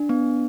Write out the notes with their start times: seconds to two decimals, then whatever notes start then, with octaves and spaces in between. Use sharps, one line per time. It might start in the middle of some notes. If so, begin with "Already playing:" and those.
Already playing: D4
0.09 B3